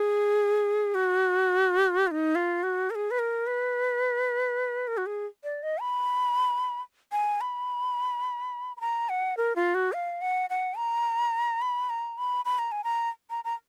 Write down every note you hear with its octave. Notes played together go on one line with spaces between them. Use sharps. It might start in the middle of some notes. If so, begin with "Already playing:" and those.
Already playing: G#4
F#4
F4
D#4
F4
F#4
A#4
G#4
B4
A#4
B4
A#4
F#4
G#4
D5
D#5
B5
G#5
B5
B5
A#5
F#5
A#4
F4
F#4
F5
F#5
F#5
A#5
B5
A#5
B5
B5
A#5
G#5
A#5
A#5
A#5